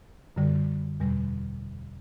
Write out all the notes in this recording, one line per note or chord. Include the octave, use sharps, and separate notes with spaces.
F#2 D3 G3
E2 B2 G3